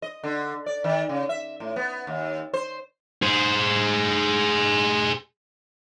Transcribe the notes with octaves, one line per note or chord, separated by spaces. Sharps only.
D#5
D3
D5
D#3
C#3
E5
A2
B3
D#2
C5
G#4 C5